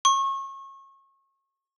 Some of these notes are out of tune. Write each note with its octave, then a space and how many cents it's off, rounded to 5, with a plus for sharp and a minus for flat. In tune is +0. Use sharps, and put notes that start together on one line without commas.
C#6 -30